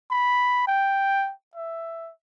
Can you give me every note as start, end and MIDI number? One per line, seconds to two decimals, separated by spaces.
0.11 0.66 83
0.67 1.32 79
1.55 2.11 76